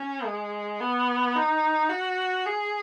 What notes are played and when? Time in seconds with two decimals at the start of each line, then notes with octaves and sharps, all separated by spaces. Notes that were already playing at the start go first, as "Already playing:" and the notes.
Already playing: C#4
0.25 G#3
0.80 B3
1.36 D#4
1.90 F#4
2.46 G#4